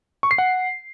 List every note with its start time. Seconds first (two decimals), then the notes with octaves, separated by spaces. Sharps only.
0.23 C#6
0.31 C7
0.38 F#5